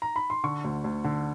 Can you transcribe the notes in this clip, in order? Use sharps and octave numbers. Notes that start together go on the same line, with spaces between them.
A#5
B5
C6
D3 C#6
D2
D2
D3